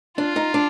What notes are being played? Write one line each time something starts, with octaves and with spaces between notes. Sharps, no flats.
D4 F4
D#4
D4